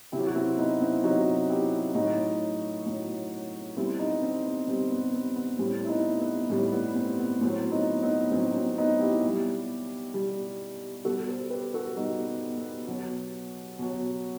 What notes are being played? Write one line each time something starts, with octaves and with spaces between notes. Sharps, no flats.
C3 F#3 E4 G4
F#4
C4 E4
B3 D#4
C4 E4
C3 F#3 D#4 F#4
E4 G4
A2 F#3 D#4 F#4
A2 F#3
B2 G3 C4 E4
B3 D#4
C4
B3
B2 G3 C4
B3
B3
B3
A2 G3 C4
E4
B3 D#4
B3
A2 G3
B3
C4
B3
A2 F#3 C4
B3 D#4
B3 D#4
A2 F#3 C4
C4
B3 D#4
E4 G4
B2
G3
B2 G3
B2 G3 F#4 A4
A4 C5
G4 B4
F#4 A4
B2 G3 D#4 F#4
B3
B3
B2 F#3
B2 F#3